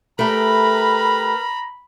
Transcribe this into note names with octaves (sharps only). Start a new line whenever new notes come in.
A3 G4 A#4 B4 A#5 B5